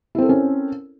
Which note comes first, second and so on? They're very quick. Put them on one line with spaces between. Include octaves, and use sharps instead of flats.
E4 C4 A4 A#4 C#4